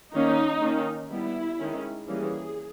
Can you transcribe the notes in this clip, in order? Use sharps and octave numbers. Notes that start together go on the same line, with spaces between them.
D#3 A#3 C#4 D#4
D#3 A#3 C#4
G3 B3 E4
D#3 G#3 C#4
E3 G3 A#3 C#4 G#4